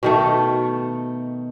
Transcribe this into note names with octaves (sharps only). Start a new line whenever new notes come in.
B2 D#3 A3